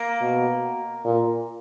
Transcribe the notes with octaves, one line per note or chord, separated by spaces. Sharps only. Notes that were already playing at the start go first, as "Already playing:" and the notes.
Already playing: A#3
B2
A#2